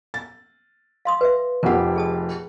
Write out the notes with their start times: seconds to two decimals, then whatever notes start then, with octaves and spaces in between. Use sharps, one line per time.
0.14 A6
1.05 F5 C6 D#6
1.21 B4 E5
1.63 F1 F2 G4 A#4 F#5
1.96 G#4 A5 D#6